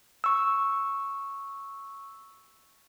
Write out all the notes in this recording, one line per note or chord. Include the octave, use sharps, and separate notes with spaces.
C#6 E6